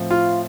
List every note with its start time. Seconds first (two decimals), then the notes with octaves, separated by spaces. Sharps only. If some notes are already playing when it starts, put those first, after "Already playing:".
Already playing: A2 F3 C4
0.11 F4